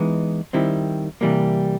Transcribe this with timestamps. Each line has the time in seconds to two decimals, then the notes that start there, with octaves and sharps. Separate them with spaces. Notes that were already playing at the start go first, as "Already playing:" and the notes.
Already playing: E3 G#3 B3 D#4
0.53 D#3 G3 C4 E4
1.21 C3 E3 G3 A#3